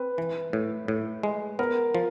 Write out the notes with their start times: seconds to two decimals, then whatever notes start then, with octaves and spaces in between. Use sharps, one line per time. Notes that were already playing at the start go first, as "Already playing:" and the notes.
Already playing: C4 B4
0.18 E3
0.53 A2
0.88 A2
1.23 G#3
1.59 B3 A#4
1.95 F3